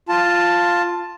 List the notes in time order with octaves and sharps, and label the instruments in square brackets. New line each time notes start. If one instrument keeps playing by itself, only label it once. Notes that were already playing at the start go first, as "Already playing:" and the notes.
[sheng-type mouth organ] F4 A5